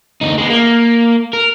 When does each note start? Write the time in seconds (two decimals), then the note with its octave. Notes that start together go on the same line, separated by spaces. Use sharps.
0.21 D2 D#4
0.38 G#3 B3
0.50 A#3
1.33 A#4